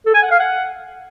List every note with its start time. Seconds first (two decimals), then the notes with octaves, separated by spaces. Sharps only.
0.06 A4
0.14 G#5
0.23 F#5
0.31 F5
0.39 F#5